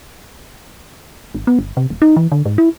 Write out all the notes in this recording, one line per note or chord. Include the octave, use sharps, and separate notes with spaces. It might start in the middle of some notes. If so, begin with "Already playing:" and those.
G#1
B3
G1
C3
D#1
D#4
E3
D3
G#2
E4